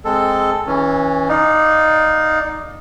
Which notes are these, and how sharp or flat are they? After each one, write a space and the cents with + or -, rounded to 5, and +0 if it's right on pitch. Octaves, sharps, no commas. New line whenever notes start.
G#3 +0 C4 +0 A4 +5
E3 -20 C#4 +0
D#4 +0 D5 +10 F5 +30